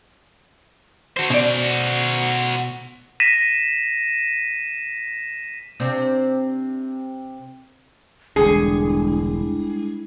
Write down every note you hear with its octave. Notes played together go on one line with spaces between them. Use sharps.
F#4 C5
B2 D5
A#6 B6 D#7 E7
C3 C4 D4
E1 C2 D3 G3 G#3 D4 E4 G#4